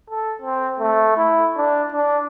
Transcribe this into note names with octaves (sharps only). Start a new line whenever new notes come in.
A4
C4
A3
E4
D4
D4